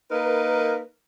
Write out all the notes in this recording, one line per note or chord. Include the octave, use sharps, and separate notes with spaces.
A#3 D#4 A#4 B4